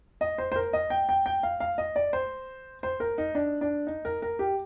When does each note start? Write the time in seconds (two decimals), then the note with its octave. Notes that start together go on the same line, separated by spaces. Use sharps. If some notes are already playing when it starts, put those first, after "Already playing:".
0.21 D#5
0.38 C5
0.52 C5
0.56 A#4
0.73 D#5
0.90 G5
1.09 G5
1.26 G5
1.43 F5
1.60 F5
1.78 D#5
1.96 D5
2.13 C5
2.83 C5
3.00 A#4
3.18 D#4
3.35 D4
3.61 D4
3.87 D#4
4.05 A#4
4.22 A#4
4.39 G4